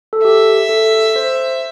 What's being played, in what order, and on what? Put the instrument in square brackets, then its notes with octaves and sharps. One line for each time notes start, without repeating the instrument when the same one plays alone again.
[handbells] A4
[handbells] G4 [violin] E5
[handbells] A4
C5